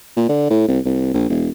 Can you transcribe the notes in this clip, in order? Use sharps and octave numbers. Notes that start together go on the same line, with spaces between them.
A#2
D3
A2
C2
C2
A#1
E1